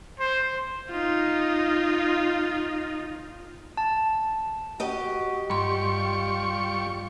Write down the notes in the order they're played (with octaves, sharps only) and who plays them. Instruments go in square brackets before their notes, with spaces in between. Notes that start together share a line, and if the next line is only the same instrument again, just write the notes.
[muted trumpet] C5
[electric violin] D#4 F4
[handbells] A5
[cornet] F#4 [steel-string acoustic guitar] G4 D#5
[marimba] G2 C6 [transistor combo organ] G3 C#6 [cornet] F4